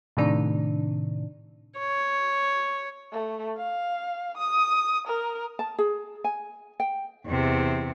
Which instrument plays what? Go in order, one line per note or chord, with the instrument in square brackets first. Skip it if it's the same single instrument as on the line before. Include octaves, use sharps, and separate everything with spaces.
[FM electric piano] A2 C3 D#3 D4
[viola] C#5
[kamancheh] A3
F5
D#6
A#4
[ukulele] A5
G#4
G#5
G5
[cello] E2 C3